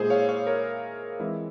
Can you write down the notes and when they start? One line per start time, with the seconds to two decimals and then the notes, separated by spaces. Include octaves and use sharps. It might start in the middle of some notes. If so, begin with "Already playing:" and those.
Already playing: A#2 G#3 E4 G#4 C5
0.10 C#5 F5
0.29 C#5 F5
0.47 A#4 C#5
1.20 E3 G#3 C4 E4